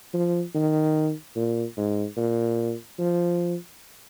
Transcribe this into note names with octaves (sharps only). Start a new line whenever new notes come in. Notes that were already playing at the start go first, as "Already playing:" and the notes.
F3
D#3
A#2
G#2
A#2
F3